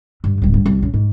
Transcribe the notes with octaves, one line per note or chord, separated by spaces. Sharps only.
G2
D1 G3
G2
C2
F#2
G#2